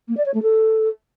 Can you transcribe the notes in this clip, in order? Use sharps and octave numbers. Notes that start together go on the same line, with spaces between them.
A#3
D5
C#5
A3
A4